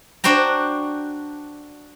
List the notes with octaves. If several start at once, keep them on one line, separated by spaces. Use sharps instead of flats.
D4 F#4 C5 G5 A#5